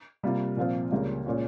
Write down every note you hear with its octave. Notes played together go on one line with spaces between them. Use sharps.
C3 G3 A#3 F4
A#2 F3 C4 F4
C#2 C#3 G3 A#3 C#4
A#2 G#3 C#4 F4